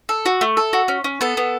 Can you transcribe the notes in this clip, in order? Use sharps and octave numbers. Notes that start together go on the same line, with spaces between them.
A4
F#4
A3
A4
F#4
C#4
C#4
B3 A4
B3